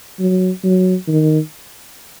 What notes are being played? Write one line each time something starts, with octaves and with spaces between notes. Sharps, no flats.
F#3
F#3
D#3